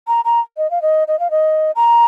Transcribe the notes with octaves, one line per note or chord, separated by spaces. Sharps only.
A#5
A#5
D#5
F5
D#5
D#5
F5
D#5
A#5